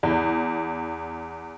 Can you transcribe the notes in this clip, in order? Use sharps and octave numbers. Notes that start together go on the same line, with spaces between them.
E2